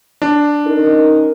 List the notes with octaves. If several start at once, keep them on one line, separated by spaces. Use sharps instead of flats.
D4
C#4 D#4 A#4